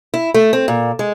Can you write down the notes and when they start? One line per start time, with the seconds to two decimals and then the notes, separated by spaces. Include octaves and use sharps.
0.14 E4
0.34 A3
0.53 C4
0.68 A#2
0.99 G#3